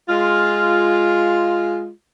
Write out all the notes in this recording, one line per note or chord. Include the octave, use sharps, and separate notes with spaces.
G#3 F4